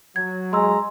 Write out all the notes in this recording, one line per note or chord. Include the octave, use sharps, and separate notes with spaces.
F#3 G#6
G#3 A#5 C6 E6